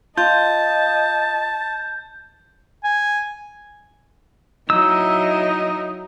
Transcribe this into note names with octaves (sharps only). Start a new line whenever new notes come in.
F4 D#5 A5 G6
G#5
F#3 D#4 E4 D#5 E6